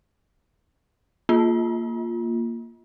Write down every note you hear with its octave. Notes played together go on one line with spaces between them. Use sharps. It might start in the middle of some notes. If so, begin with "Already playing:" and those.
A#3 F4